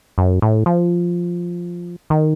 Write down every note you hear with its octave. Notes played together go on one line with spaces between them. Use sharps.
F#2
A2
F3
D#3